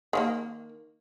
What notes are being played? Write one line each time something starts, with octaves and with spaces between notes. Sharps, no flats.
D#3 F3 A#3